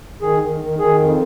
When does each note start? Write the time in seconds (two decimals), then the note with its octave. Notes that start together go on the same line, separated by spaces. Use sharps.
0.22 D#3 G#4
0.41 D#3
0.61 D#3
0.79 D#3 G#4
0.99 F2